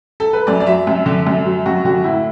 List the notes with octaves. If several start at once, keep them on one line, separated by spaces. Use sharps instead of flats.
A4
B4
F#2 D5
D5
F#3 E5
F#2
D3
F#2
F#3
F#2 F#4
D3 F#4
A2 E4